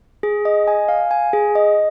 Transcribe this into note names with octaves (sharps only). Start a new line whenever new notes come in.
G#4
D#5
G#5
F5
G#5
G#4
D#5